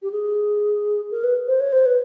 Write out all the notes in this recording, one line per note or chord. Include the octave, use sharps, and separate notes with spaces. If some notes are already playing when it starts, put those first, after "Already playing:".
G4
G#4
A#4
B4
C5
C#5
C5
B4